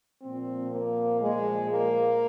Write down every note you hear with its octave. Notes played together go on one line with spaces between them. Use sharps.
A#2 F3 C4
A#3
A#2 F3 G#3
A#3